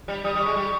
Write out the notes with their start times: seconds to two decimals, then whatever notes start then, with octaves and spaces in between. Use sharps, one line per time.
0.08 G3
0.24 G3 D#6
0.35 G3
0.40 C#6
0.46 G#3
0.56 G3